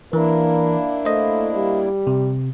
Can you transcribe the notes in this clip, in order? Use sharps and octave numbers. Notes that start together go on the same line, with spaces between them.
E3 A#3 D4 E4 A#4
A3 C5 D#5
G3
C3